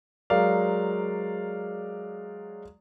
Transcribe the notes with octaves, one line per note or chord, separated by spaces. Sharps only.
F#3 G#3 A#4 D5 F5